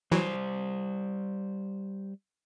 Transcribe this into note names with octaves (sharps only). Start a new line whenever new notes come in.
E3 F#3 G3 C5